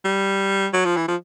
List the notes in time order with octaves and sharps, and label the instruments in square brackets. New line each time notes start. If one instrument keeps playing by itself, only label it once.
[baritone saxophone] G3
F#3
F3
E3
F3